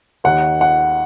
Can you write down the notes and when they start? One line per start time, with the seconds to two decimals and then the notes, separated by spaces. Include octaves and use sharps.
0.24 D#2 D#3 F#5
0.61 F#5